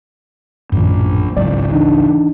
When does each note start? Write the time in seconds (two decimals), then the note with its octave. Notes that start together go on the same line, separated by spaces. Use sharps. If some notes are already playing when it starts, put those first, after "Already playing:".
0.72 A#1 F#2 A2 D#3
1.37 G#1 C#2 G2 F#3 D5
1.72 E3 D4 D#4